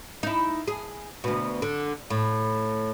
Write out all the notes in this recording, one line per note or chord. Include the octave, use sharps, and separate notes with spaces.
D#4 E4
G#4
D2 B2
D3
A2